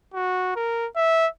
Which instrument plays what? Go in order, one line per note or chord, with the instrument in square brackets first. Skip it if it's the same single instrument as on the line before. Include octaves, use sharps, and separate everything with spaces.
[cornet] F#4
A#4
E5